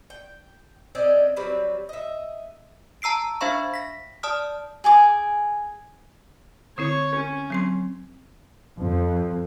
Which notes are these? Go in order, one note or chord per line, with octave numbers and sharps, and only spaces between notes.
G5
C4 C#4 D5 D#5
F#3 G3 C4 B4
D#5 E5
A5 A#5 E6 C7 D7
D4 C5 E5 F5 B5 C#6
A#6 B6
D5 A5 D#6 F6
G#4 G#5 D6
D3 C4 E4 C#5
C#4
F#3 C4 C6
F2